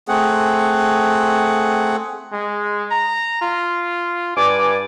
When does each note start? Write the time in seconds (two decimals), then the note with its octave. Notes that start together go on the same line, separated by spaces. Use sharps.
0.08 A3 C4 G#4 F#5
2.33 G#3
2.91 A#5
3.42 F4
4.37 G2 D5 G#5 D6